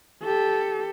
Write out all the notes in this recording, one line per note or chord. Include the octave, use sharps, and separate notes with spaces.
G4 A4